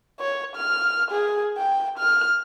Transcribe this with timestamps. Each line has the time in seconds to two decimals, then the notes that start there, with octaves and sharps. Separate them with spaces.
0.20 C#5
0.56 F6
1.11 G#4
1.57 G5
1.98 F6